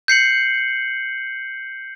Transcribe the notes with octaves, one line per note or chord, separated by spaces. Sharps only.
G6 C7 C#7 F#7